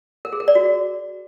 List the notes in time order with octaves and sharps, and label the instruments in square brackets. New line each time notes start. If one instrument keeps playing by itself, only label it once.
[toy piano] A#4
G#4
A#4
D5
F#4